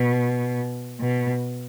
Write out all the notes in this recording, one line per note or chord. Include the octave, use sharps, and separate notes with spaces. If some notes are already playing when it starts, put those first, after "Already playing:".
Already playing: B2
B2